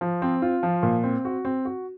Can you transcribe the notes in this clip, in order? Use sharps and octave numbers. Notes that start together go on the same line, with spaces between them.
F3
C4
F4
F3
A#2
C4
F#4
C4
F#4